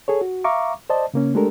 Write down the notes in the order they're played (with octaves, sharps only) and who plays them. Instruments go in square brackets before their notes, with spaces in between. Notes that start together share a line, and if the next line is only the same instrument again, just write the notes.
[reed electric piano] G#4 A4 C#5
F#4
E5 F5 A#5 C#6 D6
C5 D5 D#5 A5
C#3 A#3 C#4
G#3 A3 D4 G4 A4 A#4